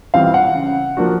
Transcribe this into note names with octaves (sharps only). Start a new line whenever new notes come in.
E3 G3 C4 F4 F5
F#5
C#3
F3 A#3 D4 F#4